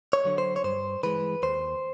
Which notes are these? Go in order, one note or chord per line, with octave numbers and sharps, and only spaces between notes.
C#5
D3 F#3
C5
C#5
G2 C5
E3 G#3 B4
D#2 C5